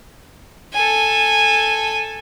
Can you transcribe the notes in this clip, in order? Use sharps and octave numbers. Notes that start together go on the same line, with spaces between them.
A4 G#5